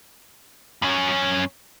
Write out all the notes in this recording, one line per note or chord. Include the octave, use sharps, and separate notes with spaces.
F#2 C#4